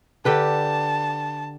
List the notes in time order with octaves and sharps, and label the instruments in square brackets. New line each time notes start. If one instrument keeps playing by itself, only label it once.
[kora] D3 G4 B4 [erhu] A5